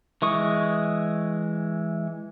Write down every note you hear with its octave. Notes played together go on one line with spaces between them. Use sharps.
E3 G#3 C#6 D#6